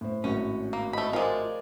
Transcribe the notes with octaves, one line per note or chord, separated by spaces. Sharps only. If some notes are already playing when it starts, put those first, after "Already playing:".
A2 C5
G#1 A2 C#4 F#4
A#3
A3 D#5 F#5 B5
F3 G#3 F4 A#4 D5